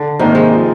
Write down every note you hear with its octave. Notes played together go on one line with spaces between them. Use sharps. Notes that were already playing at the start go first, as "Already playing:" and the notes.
Already playing: D3
G#2 C3 D#3 A#3 D#4
G#3
F3 C4 D#4